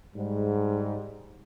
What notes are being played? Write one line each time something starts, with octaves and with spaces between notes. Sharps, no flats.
G#2 G3